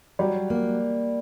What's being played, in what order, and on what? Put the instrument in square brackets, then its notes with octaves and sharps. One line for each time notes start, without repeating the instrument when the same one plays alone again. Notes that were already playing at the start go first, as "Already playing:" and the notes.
[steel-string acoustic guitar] F#3 [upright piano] G3
[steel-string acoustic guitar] A#3